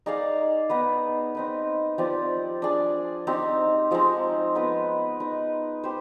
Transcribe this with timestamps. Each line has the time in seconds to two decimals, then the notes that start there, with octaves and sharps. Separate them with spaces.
0.06 D#4 G#4 D5 F5
0.69 B3 D#4 B4
1.35 C4 D#4 B4
1.98 F3 C4 G4 D5
2.62 D4 G#4 D5
3.27 C4 D#4 G4
3.91 F3 G#3 C4 D#4
4.55 B3 D#4 B4
5.20 D#4 B4 D#5
5.84 G4 C5